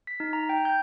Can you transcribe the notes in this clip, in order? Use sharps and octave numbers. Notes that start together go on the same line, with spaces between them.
B6
D#4
A#5
G5
G6